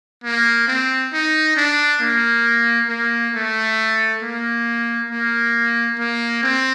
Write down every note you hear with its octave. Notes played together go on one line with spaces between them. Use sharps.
A#3
C4
D#4
D4
A#3
A#3
A3
A#3
A#3
A#3
C4